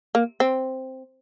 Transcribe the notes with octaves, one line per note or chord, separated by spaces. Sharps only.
A#3
C4